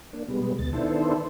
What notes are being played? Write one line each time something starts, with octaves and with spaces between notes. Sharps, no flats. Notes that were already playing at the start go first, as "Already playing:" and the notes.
A#3 D4
B2 G3 G#3 B3
D2 B2 A6
D#3 B3 D4 E4 A4 C5